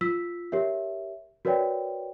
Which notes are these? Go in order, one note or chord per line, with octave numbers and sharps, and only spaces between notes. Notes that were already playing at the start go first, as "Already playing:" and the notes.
F4 E6 B6
G4 A#4 C#5 E5
F#4 A#4 B4 C#5 D5 G5